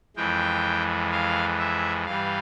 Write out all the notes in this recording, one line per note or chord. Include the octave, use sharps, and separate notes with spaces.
F2 E3 G#3 G5
F5
E5
G2 E3 G3 F5